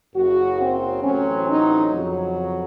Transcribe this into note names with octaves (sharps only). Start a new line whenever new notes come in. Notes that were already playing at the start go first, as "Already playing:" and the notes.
F#1 F#2 C#3 F#3 F#4
C4
A1 A2 F#3 C4 C#4
D#4
F2 C#3 F#3